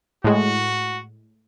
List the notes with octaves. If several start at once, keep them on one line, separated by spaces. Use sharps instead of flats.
A2 G#3 F#4